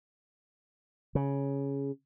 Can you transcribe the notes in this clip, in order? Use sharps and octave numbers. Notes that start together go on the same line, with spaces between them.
C#3